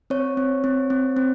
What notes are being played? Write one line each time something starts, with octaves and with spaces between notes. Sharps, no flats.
C4 C#5
C4
C4
C4
C4